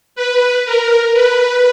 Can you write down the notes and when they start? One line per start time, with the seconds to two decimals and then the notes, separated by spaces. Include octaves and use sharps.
0.16 B4
0.65 A#4
1.14 B4